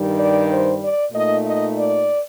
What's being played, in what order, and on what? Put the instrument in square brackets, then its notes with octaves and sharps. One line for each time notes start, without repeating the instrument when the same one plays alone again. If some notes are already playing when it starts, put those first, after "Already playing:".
Already playing: [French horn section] G2 D#3 G3
D5
C5
D5
A#2 A3 D#4 D#5
D#5
D5